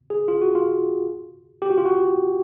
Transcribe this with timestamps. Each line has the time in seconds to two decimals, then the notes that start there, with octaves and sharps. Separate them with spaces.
0.10 G#4
0.28 F4
0.42 F#4
0.55 F4
1.62 G4
1.70 F#4
1.78 F4
1.85 F#4